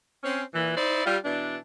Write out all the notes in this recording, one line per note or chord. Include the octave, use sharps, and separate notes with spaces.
C4 C#4
A#2 E3
D#4 E4 C5 D5
G3 F4
B2 E3 D4